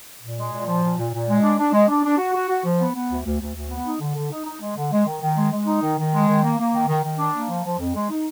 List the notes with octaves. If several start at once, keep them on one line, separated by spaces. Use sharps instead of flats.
A#2
G#3
A#2
F3
A#2
A#2
A#2
G#3
D4
D4
G#3
D4
D4
F#4
F#4
F#4
F3
B3
B3
D2
D2
D2
D2
B3
D#4
D3
D3
D#4
D#4
G#3
D3
G#3
D#3
D#3
G#3
G#3
D#4
D#3
D#3
G#3
D#3
A#3
A#3
D#3
D#3
D#3
D4
A#3
F3
F3
F2
G#3
D#4